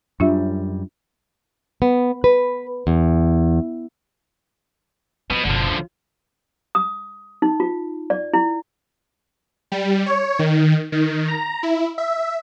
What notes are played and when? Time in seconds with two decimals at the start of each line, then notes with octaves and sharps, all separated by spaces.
0.20 F#2 G3 D4 F4 E5
1.82 B3
2.24 B4
2.87 E2
5.30 B2 F3
5.45 F#1 B2 D3 F3
5.71 F4
6.75 D#6
7.42 D#4
7.60 F4
8.10 D5
8.33 E4
9.72 G3
10.06 C#5
10.39 D#3
10.92 D#3
11.28 A#5
11.63 E4
11.98 E5